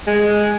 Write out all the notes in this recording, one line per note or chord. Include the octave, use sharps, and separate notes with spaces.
G#3